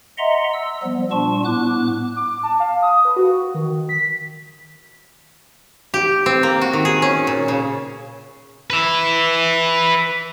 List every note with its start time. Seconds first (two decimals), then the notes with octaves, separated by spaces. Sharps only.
0.18 D#5 E5 F#5 A#5 C6
0.53 E6
0.83 F3 G3 B3
1.11 A#2 G3 D4 F4 A5 C#6
1.45 A2 B3 D6 F#6
2.16 D6
2.43 A5
2.60 F5
2.82 D#6
3.05 B4
3.16 F#4
3.54 D#3
3.89 B6
5.94 G4
6.26 C4
6.43 A#3
6.61 F#4
6.73 D#3
6.85 G#4
7.02 C#4
7.27 A#2
7.48 C#3
8.70 B4 E5